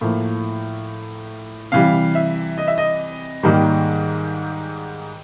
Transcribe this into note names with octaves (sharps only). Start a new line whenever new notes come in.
A2 F3 A#3
C3 E3 G3 F5
E5
D#5
E5
D#5
G#2 D#3 G3 A#3